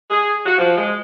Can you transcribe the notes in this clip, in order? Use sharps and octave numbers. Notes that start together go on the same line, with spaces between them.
G#4
F#4
F3
G#3